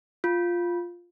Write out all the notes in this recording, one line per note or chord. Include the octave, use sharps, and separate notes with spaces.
F4